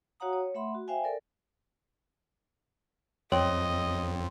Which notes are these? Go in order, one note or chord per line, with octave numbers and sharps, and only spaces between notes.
F#4 C#5 F5 F#5 A#5 D#6
C#5
A3 E5 F#5 B5 C6
F#4
C5 E5 F5 G5 G#5
A4 A#4 D5
F2 C4 C#5 D#5